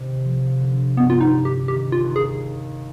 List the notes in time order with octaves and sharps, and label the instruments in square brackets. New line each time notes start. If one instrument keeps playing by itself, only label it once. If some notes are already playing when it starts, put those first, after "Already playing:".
Already playing: [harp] C3 D#3
F3
D3
[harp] G2 [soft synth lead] B3
[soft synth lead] F4
D#4
[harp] G2
[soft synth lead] G4
[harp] D#3 [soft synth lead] G4
[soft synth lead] F4
[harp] D#2
[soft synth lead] G#4